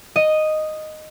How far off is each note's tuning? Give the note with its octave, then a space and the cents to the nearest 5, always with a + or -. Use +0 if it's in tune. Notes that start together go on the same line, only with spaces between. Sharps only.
D#5 -5